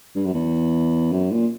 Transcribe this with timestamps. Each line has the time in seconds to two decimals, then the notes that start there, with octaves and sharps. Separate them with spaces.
0.16 G2
0.25 F#2
0.34 E2
1.12 F#2
1.31 A#2